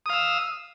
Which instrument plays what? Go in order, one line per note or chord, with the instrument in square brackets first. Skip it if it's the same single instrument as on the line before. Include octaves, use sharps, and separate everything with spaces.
[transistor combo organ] D#6
F5
E6